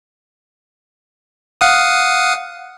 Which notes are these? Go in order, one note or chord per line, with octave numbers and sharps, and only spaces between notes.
F5 F#5 D#6